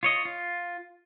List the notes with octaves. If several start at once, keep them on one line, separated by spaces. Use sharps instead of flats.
F4 C#5 D#5
F4